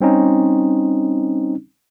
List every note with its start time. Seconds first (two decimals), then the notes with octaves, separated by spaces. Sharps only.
0.01 G3 C4 C#4 D#4